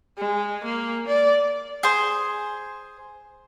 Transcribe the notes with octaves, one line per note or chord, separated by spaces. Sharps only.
G#3
A#3
D5
G#4 C5